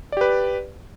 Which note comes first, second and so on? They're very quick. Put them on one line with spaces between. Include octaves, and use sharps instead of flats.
D5 G4 B4